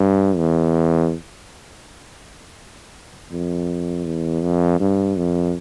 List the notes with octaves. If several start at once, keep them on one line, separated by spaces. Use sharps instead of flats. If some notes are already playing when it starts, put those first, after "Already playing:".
Already playing: G2
E2
F2
E2
F2
G2
F2